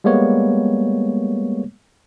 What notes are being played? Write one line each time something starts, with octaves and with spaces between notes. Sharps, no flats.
G3 G#3 A#3 B3 C#5